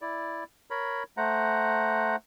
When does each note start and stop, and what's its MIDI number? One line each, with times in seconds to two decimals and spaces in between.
0.01 0.44 64
0.01 0.44 74
0.70 1.03 70
0.70 1.03 73
0.70 1.03 83
1.17 2.16 57
1.17 2.16 72
1.17 2.16 78
1.17 2.16 82